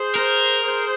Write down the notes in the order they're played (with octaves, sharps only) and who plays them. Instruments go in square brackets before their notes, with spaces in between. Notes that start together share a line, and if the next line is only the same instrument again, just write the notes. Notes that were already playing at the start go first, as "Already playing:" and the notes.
Already playing: [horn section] G#4 C5
[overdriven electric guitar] A#4
[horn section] G#4 C5